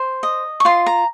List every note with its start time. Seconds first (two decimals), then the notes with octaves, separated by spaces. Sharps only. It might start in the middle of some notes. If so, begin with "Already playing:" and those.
Already playing: C5
0.23 D#5
0.60 C#6
0.65 F4 C6
0.86 A#5